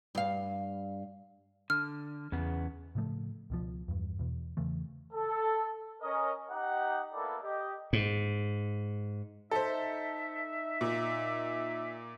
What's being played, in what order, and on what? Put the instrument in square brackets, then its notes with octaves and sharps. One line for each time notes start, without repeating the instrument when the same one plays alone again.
[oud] G2 F5
[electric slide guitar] D3 [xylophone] F6
[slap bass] E2 [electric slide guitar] C#3 B3
[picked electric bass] A2 C#3 F3 A3
C#2 B2 F3
E2 G2
E2 B2
E2 C#3 E3 A3
[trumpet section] A4
C#4 A#4 D#5
D#4 G4 F#5
A#3 B3 E4 A4 D5 B5
G4 D#5
[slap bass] G#2
[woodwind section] D#4 E5 [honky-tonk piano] A4 C5
[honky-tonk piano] A#2